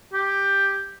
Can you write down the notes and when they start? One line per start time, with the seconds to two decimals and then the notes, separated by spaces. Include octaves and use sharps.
0.13 G4